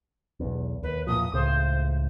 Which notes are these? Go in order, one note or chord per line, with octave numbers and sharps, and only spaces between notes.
B1 E2
D#2 B4
E2 A#2 F3 D#6
C#2 A2 C#3 C5